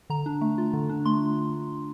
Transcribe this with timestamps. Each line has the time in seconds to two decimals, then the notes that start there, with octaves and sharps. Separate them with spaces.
0.10 D3 A#5
0.26 D4
0.41 A3
0.58 F4
0.73 D3
0.89 D4
1.06 A3 C6